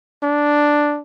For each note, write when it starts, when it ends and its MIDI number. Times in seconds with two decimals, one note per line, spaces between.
0.23 1.01 62